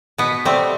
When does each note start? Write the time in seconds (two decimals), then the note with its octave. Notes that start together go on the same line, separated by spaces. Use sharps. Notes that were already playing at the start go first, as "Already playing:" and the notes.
0.18 B2 B3
0.45 G3 A3 C4